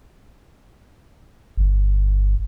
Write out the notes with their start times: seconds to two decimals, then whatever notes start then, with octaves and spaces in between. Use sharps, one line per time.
1.57 G1